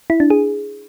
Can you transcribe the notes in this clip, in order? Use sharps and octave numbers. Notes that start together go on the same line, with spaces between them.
E4
D4
G#4